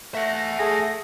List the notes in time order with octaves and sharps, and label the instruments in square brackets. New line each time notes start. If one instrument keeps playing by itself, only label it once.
[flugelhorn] A3 [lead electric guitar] E5 F#5 [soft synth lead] A#6
[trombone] A3 [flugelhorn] G#4 [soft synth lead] A#6